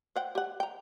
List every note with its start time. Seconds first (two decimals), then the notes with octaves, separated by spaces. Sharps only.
0.16 C5 F#5 G5
0.35 G4 F#5
0.60 G5 A#5